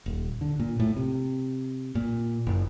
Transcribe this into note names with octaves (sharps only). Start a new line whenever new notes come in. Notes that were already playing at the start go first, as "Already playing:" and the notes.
D#1
D3
A#2
A2
C3
A#2
F#1